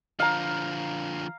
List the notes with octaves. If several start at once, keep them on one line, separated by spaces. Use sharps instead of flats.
D3 F3 F5 A#5